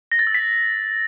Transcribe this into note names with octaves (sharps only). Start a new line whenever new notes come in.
A#6
A6
E6
B6